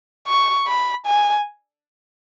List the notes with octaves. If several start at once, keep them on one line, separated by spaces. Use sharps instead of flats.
C#6
B5
G#5